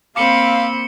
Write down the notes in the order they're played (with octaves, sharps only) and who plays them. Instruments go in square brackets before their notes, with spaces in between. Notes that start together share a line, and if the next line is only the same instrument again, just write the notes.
[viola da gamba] A#3 C4 [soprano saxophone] F5 [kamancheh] B5 E6 [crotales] D6 C#7 G7